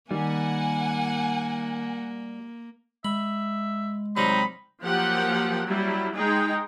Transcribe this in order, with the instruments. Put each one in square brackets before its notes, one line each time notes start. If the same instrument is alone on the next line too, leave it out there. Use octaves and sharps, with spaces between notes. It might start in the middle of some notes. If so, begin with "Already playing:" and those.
[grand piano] D#3 [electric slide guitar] G3 [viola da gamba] A#3 [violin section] F#5 G#5
[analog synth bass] G#3 [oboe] E5 [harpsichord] B5
[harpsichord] C3 F#3 G3 [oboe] D#4 [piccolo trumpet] B5
[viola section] F3 F#3 A#3 G4 F#5 G5
F#3 G3 E4
G#3 D#4 G#4 G5